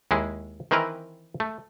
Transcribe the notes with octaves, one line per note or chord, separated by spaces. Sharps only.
D#2 G#3 E4 G#4
D#3 E3 C4 E4 A#4 B4
A3